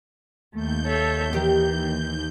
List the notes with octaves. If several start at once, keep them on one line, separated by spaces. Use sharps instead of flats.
D#2 A3 G6
A4 C#5 E5
D#3 E3 G4